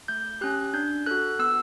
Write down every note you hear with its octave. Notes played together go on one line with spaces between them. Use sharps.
A3 G6
C#4 G4 F#6
D4 G6
F#4 A4 F#6
B3 E6